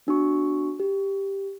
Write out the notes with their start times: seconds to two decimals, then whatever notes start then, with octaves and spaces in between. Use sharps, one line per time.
0.07 B3 D4 F#4 C#6
0.80 G4